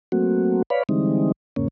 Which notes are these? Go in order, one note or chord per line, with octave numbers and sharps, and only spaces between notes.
F#3 A3 A#3 C4 F#4
B4 C#5 D5 F5 B5
D3 E3 G3 G#3 C4 D#4
E2 G#2 C#3 A#3 C#4